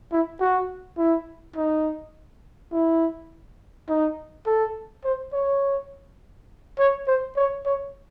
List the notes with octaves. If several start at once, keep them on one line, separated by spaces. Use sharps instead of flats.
E4
F#4
E4
D#4
E4
D#4
A4
C5
C#5
C#5
C5
C#5
C#5